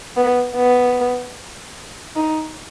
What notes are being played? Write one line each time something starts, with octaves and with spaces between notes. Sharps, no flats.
B3
B3
D#4